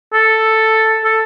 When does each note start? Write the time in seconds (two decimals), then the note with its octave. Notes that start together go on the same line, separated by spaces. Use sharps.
0.13 A4
1.04 A4